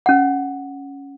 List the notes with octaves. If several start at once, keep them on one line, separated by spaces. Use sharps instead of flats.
C#4 F#5